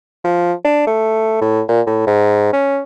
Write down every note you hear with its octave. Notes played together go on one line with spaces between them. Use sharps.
F3
D4
A3
A2
A#2
A2
G#2
C#4